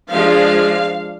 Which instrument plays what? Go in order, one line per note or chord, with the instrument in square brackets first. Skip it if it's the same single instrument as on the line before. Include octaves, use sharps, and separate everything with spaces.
[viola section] F3 G#3 D4 F5